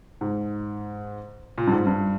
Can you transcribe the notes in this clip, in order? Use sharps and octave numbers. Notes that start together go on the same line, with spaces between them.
G#2
A#2
G2
G#2
G2